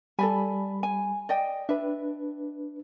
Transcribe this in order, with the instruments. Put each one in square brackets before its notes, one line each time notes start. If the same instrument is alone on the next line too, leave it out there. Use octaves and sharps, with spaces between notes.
[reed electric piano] G3 B5 [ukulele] A4 D5 G#5
[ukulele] G#5
D5 D#5 G5
[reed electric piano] D4 B4 [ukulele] E5